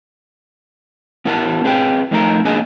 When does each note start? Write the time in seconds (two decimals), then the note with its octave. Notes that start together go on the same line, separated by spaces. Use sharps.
1.25 B3 E4 A#4 F#5 G5 A5
1.64 C4 G#4 B4 G5
2.11 F2 A3 D#4 A4 A#4 A#5
2.45 A#3 B3 D4 G#4 D#5 G#5